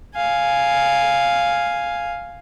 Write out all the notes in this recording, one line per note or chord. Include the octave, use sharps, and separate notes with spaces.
F5 G#5